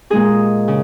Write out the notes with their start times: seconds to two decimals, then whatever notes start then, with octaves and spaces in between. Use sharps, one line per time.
0.10 A#2 G#3 D#4 G#4
0.68 C#3